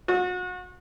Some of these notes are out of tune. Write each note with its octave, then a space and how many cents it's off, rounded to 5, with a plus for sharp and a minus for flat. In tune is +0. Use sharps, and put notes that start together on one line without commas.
F#4 -35